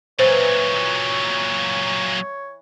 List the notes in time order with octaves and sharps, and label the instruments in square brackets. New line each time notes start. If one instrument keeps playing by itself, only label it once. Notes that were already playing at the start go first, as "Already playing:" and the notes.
[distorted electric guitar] A#2 F#3 [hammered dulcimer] E3 [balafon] C5 [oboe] C#5